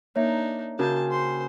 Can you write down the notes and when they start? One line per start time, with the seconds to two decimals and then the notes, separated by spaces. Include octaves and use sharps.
0.16 A#3 D4 D#4 C#5 E5
0.79 C#3 C#4 F#4 A#4 G#5 A5 G6
1.09 C5 C6